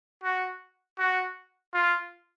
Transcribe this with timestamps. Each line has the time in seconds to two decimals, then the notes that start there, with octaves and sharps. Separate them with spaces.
0.24 F#4
0.99 F#4
1.74 F4